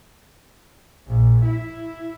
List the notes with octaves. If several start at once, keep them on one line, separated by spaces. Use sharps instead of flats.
A#1
E4